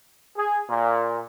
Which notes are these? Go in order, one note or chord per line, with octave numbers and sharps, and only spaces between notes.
G#4
A#2